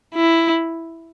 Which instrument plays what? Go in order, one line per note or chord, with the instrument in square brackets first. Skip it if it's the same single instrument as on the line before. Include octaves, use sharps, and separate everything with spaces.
[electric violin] E4